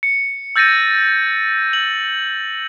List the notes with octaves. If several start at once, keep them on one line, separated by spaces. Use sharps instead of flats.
C#7
E6 G6 A6 A#6 C#7 D#7
F#7